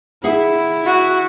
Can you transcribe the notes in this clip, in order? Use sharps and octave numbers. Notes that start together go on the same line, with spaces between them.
E4 G#4 E5 F#5
F#4